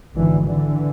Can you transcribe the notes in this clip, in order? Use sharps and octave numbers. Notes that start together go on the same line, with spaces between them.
G#1 G#2 D3 E3
D3 E3